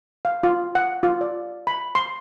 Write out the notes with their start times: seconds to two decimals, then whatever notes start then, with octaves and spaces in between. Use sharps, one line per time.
0.25 F5
0.43 F4
0.75 F#5
1.03 F4
1.21 D5
1.67 B5
1.95 C6